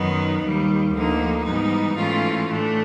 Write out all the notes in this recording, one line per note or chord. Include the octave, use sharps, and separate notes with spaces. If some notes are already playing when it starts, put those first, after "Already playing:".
Already playing: F#2 D#3 F#3 B3 D#4
D#2 D#3 G3
D2 D3 F3 A#3 D#4
G#2 E3 G3 B3 D#4
G#2 E3 A3 C#4 F4
A2 E3 A3 D4